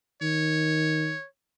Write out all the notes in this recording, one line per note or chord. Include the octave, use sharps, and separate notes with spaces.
D#3 C#5